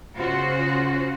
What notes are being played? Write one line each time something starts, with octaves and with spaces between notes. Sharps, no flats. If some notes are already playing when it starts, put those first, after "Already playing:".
C#3 F4 F#4 C5